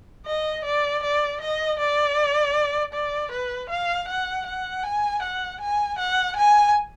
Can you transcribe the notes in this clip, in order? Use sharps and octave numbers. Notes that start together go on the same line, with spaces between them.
D#5
D5
D5
D#5
D5
D5
B4
F5
F#5
F#5
G#5
F#5
G#5
F#5
G#5